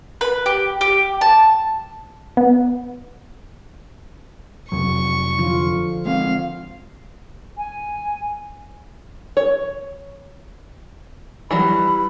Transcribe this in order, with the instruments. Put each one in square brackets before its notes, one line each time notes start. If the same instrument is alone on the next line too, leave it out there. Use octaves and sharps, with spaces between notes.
[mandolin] B4
G4
G4
A5
[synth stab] B3
[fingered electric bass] F2 C3 F#3 [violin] C#6
[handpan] D3 F3 F4
[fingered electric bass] G#3 C4 [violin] F5
[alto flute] G#5
[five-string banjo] C#5
[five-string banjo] E3 F#3 G3 [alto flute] B5